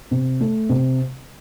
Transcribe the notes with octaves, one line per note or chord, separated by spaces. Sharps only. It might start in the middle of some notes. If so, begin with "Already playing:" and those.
C3
A3
C3